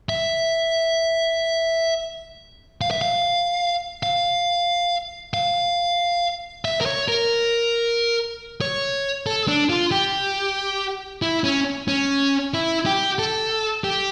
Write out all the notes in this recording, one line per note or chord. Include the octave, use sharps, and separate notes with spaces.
E5
F5
E5
F5
F5
F5
E5
A#4
C#5
A#4
C#5
A4
D4
F4
G4
E4
C#4
C#4
E4
G4
A4
G4